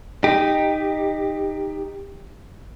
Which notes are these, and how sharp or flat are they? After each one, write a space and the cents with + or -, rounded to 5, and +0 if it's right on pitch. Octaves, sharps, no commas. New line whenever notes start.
D#4 -5 G4 +15